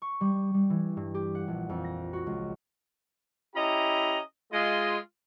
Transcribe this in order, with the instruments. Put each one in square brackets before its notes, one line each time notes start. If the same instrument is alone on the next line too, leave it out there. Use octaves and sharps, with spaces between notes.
[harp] C#6
G3
G3
E3
G2
G4
F#5
A#1
F2
A#6
F#4
C#2
[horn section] C#4 E4 G4 D#5 A#5
G#3 F4 D#5